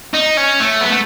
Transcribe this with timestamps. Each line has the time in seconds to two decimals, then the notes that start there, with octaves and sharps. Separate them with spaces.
0.14 D#4
0.37 C#4
0.60 A3
0.81 B3
0.90 A3